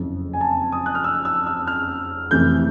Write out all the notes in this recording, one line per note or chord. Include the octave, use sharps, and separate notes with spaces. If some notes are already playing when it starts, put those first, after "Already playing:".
Already playing: F#1 F2 C#3
G#5
A5
D#6
F#6
F6
E6
E6
E6
F6
F2 C3 E3 A3 G6